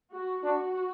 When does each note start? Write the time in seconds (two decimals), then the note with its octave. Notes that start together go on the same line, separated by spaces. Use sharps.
0.13 F#4
0.44 D4 F#4